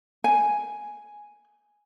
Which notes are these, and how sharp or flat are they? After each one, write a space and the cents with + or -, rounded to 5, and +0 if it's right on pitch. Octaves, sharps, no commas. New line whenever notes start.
G#5 +0